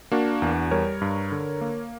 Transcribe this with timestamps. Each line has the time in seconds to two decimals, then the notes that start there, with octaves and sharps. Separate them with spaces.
0.12 A#3 D4 F#4
0.42 E2
0.71 G3 A#4 C#5
1.02 G2
1.32 D3
1.61 A#3